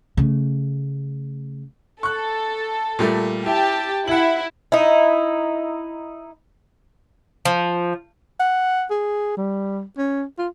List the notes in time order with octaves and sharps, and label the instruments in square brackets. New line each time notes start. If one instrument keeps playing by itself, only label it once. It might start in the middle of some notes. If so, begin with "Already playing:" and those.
[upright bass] C#3 A3
[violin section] A4 [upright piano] C#6 F#6
[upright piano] A#2 G3 A3
[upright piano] E4 [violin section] G4 G5 A5
[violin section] E4 [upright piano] F#5 F#7
[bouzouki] D#4 E4
F3
[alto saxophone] F#5
G#4
G3
C#4
F4